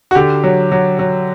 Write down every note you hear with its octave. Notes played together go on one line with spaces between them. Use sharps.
F#4
D3 G4
F#3
F#3
F#3